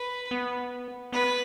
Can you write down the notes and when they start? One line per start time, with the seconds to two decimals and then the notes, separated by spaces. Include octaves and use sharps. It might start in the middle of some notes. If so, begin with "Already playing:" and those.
Already playing: B4
0.31 B3
1.12 B3 B4